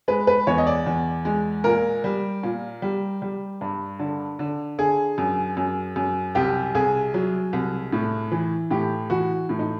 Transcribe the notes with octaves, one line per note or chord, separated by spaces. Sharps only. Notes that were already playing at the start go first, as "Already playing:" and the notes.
G#3 B4
B4
E2 C#5
D#5
D5
E2
G#3
A#2 A#4
G3
A#2
G3
G3
G2
D3
D3
D3 G#4
F#2
F#2
F#2
C2 G4
C2 G#4
F#3
C2
A2
E3
A2 G4
E3 F#4
A2
D#4